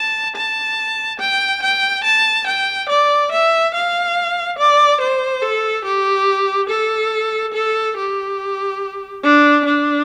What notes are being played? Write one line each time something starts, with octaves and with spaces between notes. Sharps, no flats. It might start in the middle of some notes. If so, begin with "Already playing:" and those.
Already playing: A5
A5
G5
G5
A5
G5
D5
E5
F5
D5
C5
A4
G4
A4
A4
G4
D4
D4